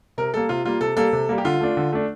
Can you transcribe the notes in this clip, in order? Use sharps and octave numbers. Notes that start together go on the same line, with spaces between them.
C3 A#4
G3 A#3 A4
C3 F4
G3 A#3 F4
C3 A4
G3 A#3 A4
C3
G3 A#3
G4
D3 F4
A3 D4
D3
A3 D4